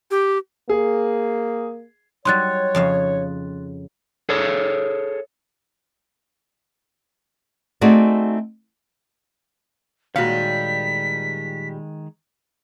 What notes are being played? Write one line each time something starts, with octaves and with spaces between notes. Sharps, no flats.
G4
A#3 G#4
F#3 G3 D#4 C#5 C6 F#6 A6
F2 C#3 F5
G#4 A4 C#5
A3 C4 D#4 F#4 G#4 D5
A#2 D#3 G3 G#3 F#4 C#5 F5 B6